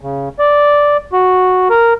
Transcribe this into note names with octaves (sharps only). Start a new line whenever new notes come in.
C#3
D5
F#4
A#4